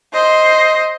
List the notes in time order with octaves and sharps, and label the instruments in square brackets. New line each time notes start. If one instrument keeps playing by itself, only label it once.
[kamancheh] C5 D#5